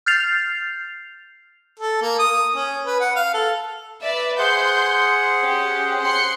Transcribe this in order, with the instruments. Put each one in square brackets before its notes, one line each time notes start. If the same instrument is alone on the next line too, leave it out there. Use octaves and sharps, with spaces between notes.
[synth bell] F6 G6 A6 C7 F7
[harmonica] A4
A#3
D#6
C#4
B4
F#5
F5
A4
[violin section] B4 D5 E5
[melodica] G#4 C5 F#5 [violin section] C6 G6
[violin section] C#4 G4
C6 F#6 C#7